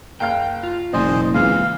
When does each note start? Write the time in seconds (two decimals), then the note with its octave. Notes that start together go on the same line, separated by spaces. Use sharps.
0.20 F#1 F5 G5 F6
0.63 F4
0.93 F#1 B2 E3 C5 D5 D#5 G#5
1.34 C#3 E3 G#3 C4 F4 F5